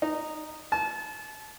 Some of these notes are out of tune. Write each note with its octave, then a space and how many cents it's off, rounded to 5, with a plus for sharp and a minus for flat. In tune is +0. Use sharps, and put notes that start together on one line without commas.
D#4 -10
A5 -30